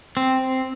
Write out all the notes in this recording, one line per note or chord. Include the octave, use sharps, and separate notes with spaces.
C4